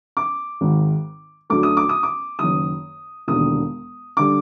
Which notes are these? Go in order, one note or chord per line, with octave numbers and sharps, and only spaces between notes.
D6
G#1 G#2 D#3
D2 D3 F#3 A3 D6
D#6
D6
D#6
D6
F#1 F#2 D#3 F#3 D#6
E1 D#2 D3 D#6
D3 G3 D6